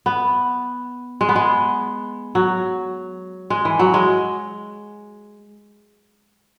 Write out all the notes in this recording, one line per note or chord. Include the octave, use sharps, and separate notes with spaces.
B3
G#3
B3
G#3
F#3
G#3
E3
F#3
G#3